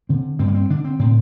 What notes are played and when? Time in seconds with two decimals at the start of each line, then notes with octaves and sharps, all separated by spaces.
0.09 D3 C4
0.39 G2 C4
0.48 A#3
0.55 C4
0.70 D3 D4
0.84 C4
0.99 A2 C4